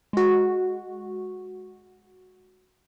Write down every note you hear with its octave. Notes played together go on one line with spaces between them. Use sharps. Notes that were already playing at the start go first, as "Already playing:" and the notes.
G#3 F#4